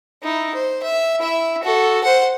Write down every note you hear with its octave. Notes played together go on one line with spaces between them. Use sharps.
D#4 E4
C5
E5
E4 E5
F#4 A4
C5 F#5